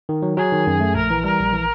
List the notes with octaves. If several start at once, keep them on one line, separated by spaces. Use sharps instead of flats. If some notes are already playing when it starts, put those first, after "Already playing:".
D#3
F#3
F#3 G#4
D#3
F#2
A3
A#1 A#4
E3
G3 A#4
A#1
E3